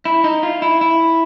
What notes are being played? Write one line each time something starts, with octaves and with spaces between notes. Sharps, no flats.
E4
D#4
F4
E4
E4